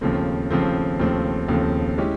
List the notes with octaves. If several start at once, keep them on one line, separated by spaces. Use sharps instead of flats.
D#2 C#3 F3 A3 C4
D#2 C#3 F3 A3 C4
D#2 C#3 F3 A3 C4
D#2 C#3 F3 A3 C4
G#3 C#4 E4 G4